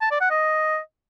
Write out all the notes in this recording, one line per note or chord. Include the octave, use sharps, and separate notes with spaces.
A5
D5
F#5
D#5